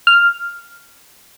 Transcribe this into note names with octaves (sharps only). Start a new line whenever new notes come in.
F6